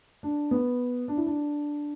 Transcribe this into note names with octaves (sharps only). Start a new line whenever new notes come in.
D4
B3
D4
E4
D4